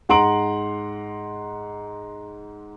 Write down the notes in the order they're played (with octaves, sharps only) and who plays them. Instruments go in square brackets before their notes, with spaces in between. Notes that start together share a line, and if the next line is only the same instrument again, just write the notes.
[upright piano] G#2 F#5 A#5 C6 D7 F#7